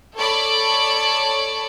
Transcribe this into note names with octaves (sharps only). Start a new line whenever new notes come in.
A4 C#5 D5 A5 B5